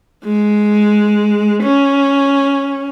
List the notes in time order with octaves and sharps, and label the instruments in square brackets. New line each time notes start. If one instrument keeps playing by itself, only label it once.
[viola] G#3
C#4